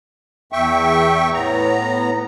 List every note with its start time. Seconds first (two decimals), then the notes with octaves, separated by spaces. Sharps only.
0.52 E2 E5 G5 C#6
1.34 A2 B3 A#5